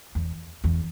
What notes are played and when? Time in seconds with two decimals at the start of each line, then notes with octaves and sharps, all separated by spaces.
0.15 E2
0.64 E2